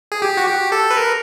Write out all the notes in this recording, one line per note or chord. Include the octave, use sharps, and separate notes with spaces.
G#4
G4
F#4
G4
A4
B4
A#4